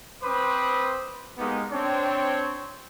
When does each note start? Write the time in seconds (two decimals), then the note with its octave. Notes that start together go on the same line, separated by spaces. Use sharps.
0.23 C4 B4 C5 B5 D6 D#6
1.38 G#3 A#3 B3 D#4 G4 A#4
1.72 C4 D4 C#5